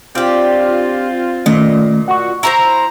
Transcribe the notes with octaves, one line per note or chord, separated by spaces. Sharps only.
C4 D4 F4 G4
A#2 D#3 A3 C#4 D#5
F#4 F#5 C#6
E4 F4 C5 A#5